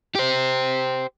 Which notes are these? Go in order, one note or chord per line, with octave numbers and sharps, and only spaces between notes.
G4 C5